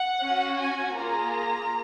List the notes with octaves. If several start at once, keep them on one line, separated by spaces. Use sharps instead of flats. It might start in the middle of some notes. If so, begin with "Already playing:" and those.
Already playing: F#5
C#4 F#4
G#5
A#3 F4 G#4 A#5